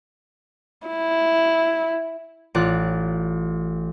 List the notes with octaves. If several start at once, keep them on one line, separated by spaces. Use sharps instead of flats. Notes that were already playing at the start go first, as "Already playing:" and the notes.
E4
A1 F4 D5 F#6